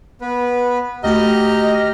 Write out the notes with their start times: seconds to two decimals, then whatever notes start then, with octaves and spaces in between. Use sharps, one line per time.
0.21 B3 B4
1.04 D2 A3 F#4 G4 D#5 A#5 F6